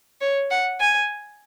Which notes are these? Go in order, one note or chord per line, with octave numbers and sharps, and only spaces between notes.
C#5
F#5
G#5